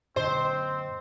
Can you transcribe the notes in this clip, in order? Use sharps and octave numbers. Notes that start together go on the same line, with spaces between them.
F#2 A#2 D3 C4 C5 D#5 C7